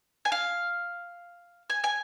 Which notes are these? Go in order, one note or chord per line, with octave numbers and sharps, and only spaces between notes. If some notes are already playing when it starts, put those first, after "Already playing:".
G#5
F5
G#5
G#5